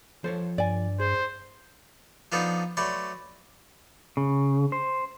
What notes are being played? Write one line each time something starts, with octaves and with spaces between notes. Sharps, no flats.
F3 A4 C5 C#5
G2 D5 G#5
G#4 C5
F3 B3 D4 D#4 A4 B4
F#3 A3 B4 D5 B5 C6
C#3
C5